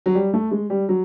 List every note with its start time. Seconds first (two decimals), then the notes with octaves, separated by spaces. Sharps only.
0.06 F#3
0.15 G3
0.34 A3
0.51 G#3
0.70 G3
0.89 F#3